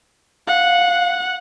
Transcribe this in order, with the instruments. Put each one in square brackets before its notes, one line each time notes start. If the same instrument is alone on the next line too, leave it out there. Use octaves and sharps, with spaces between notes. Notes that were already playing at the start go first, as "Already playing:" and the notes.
[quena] F5 [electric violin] F#5